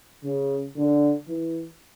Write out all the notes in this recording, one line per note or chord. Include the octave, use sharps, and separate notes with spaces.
C#3
D3
E3